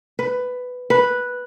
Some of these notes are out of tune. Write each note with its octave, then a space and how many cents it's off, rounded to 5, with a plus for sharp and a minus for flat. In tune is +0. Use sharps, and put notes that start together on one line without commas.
B4 +10
B4 -5